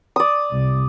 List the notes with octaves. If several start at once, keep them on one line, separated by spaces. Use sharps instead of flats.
D5 D#6
C2